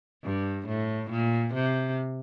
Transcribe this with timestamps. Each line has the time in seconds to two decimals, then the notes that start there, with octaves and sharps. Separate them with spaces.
0.24 G2
0.67 A2
1.10 A#2
1.54 C3